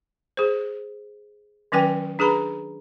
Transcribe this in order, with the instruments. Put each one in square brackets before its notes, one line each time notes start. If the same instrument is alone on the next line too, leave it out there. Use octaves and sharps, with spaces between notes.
[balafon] G#4 C5
D#3 F#3 C#4 B4 G5 G#5
D4 G#4 B4 A#5 B5